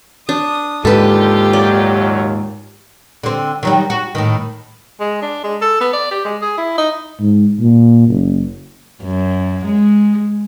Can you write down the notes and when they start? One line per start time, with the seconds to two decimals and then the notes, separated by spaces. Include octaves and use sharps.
0.29 D4 D#6
0.85 D#2 G#2 D3 F4 G4 A4 B4
1.53 D#2 A#2 F#3 D5
3.23 D3 C4
3.63 D#3 F#3 G3
3.90 F#4
4.15 A2 D#3
5.00 G#3
5.22 D4
5.44 G#3
5.61 A4
5.81 B3
5.93 D5
6.11 G4
6.25 G#3
6.41 G#4
6.58 E4
6.78 D#4
7.20 G#2
7.60 A#2
8.08 F#1
9.03 F#2
9.66 G#3